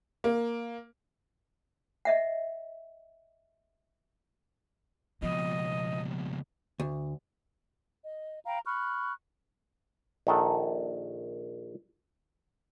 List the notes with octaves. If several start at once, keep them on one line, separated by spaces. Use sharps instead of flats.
A#3
D#5 E5 F#5
C#2 B2 F3 D#5
D2
D#5
F5 G5 A#5 B5
B5 C#6 F6 F#6
A#1 D#3 A4 F#5